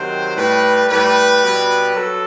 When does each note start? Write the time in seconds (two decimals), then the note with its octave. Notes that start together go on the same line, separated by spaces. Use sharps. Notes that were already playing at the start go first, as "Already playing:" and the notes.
Already playing: C3 D#3 F#3 C5
0.37 A2 G3 B4
0.89 A2 G3 B4
1.41 B2 G3
1.93 F#3 A4